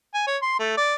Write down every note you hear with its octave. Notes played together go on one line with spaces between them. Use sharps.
G#5
C#5
C6
A3
D5